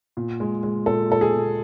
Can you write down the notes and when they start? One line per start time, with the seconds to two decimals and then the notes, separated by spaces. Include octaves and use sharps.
0.17 A#2
0.40 G#3
0.63 G#3
0.86 A#2 A4
1.10 A#2 A4
1.21 G#4
1.33 A#2